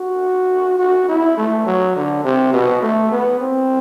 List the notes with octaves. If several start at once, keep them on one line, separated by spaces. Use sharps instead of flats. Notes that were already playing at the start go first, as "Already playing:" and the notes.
Already playing: F#4
F#4
E4
A3
F#3
D3
C3
B2
A3
B3
C4